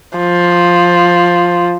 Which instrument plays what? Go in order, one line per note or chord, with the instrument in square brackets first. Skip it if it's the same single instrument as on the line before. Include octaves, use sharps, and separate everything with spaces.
[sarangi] F3